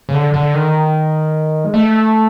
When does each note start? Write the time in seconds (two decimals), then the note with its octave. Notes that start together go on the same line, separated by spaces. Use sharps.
0.09 C#3
0.14 D3
0.34 D3
0.54 D#3
1.64 G#3
1.74 A3